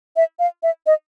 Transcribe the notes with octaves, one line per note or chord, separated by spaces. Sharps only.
E5
F5
E5
D#5